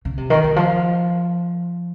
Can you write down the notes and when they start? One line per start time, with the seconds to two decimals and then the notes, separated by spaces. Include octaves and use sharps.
0.05 C#3
0.17 C3
0.30 D#3
0.44 D#3
0.56 F3